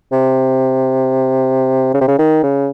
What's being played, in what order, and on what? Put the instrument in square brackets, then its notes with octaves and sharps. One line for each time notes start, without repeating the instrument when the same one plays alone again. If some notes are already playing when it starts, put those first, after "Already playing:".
[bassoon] C3
C#3
C3
C#3
D#3
C#3